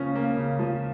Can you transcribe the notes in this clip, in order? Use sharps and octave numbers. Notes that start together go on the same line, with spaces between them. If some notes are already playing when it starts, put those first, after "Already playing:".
Already playing: C#3 F3 A#3 C#4
A#3
C#3
F3